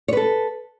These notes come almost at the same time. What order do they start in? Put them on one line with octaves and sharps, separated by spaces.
C#5 B4 A4